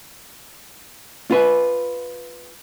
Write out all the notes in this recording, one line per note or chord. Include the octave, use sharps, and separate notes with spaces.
F4 B4